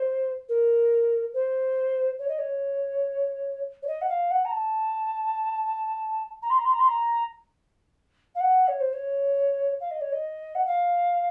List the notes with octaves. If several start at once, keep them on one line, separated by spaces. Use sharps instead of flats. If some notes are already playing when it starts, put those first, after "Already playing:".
Already playing: C5
A#4
C5
C#5
D#5
C#5
C#5
D#5
F#5
F5
F#5
A#5
A5
A#5
C6
A#5
C6
A#5
C6
A#5
F5
F#5
C#5
C5
C#5
F5
D#5
C#5
D#5
F#5
F5